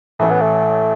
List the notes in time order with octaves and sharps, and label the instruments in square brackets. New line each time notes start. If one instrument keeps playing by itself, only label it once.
[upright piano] A1 A2 E3 [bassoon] A3
[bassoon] B3
A3